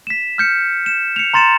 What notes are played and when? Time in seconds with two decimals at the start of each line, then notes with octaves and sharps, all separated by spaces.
0.07 B6 E7
0.38 F6 G6 C#7
0.86 E7
1.16 C#7 F7
1.34 A#5 C6 A6 C#7 E7